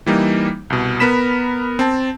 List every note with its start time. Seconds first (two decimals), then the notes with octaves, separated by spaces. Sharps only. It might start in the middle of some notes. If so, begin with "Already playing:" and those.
0.06 E3 G3 A#3 D#4
0.70 C2 B2
1.00 B3 A#4 B5 B6 E7
1.79 C4 A5